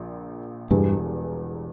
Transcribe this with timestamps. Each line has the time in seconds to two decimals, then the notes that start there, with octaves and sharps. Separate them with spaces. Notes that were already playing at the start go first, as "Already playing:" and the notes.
Already playing: A#1 A#2
0.71 E1 E2 G2 E3 G3